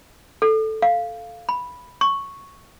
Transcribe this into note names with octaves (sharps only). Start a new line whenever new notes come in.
A4
F5
B5
C#6